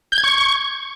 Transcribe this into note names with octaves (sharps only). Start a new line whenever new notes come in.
G6
G#6
C#6